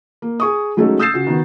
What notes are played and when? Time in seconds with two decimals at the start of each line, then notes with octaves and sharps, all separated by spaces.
0.22 A#3
0.40 G#4 C#6 D#6
0.77 F#3 G#3 A3 C#4 D#4 A4
0.99 D#6 E6 G6 A6 C7 E7
1.14 C#3 F#4
1.27 D#3 B3 F#4